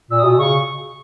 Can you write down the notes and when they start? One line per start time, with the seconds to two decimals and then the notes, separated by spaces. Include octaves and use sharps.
0.10 A#2 E6
0.19 D#6
0.24 B2
0.38 C#3 C#6